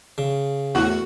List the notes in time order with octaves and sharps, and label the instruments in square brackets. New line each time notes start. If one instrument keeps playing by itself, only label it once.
[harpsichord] C#3
[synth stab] E2 A2 [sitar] F#4